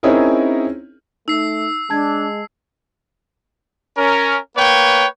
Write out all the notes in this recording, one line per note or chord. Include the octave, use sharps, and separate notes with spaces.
C4 C#4 D#4 E4 G#4 A#4
A3 D#4 E6 C7
G#3 D4 A5 G#6
C#4 A#4
A#3 B4 C#5 G5